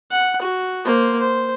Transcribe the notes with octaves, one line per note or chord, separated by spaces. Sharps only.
F#5
F#4
A#3 C5
C5